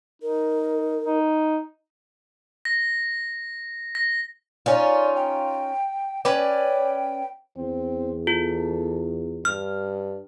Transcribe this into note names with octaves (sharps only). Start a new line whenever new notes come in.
D#4 A#4
D#4
A#6
A#6
C#4 D#4 F4 D5
G5
C#4 B4 D5 G5
E2 C4
F4 A4
G2 F6